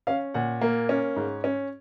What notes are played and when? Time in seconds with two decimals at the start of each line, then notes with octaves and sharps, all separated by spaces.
0.07 C#4 F5
0.34 A#2 F#5
0.61 A#3
0.89 C#4
1.16 G#2
1.44 C#4